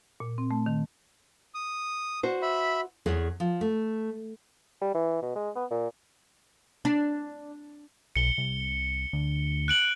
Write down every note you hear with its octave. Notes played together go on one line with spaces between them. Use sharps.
A#2
C4
A3
D#3
D#6
F#4 C5
E5 B5
E2 G#4 C#5
F3
A3
G3
E3
B2
G#3
B3
A#2
D4
B1 C#7 G7
C2
D2
F#6 D7 F#7